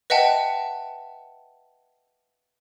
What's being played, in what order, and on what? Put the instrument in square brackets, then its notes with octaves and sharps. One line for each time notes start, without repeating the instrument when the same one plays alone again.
[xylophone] B4 D#5 E5 F#5 G5 A5